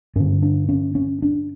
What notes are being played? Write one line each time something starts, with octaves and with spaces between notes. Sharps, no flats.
G2 D3 C#4
D4
C#4
C#4
D4